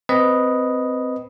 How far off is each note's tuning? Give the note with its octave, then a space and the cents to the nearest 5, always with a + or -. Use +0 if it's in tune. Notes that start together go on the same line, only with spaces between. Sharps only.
C4 -15 B4 -5 D#5 +0